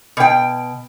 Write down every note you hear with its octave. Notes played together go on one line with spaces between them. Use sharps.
B2 G5